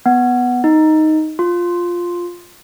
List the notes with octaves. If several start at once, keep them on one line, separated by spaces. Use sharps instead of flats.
B3
D#4
F4